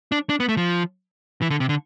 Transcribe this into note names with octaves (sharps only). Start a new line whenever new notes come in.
D4
D4
B3
A3
F3
E3
D3
C3
D3